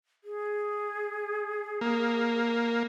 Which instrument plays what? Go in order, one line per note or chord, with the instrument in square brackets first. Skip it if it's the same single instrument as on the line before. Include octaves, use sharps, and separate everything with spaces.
[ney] G#4
[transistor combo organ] A#3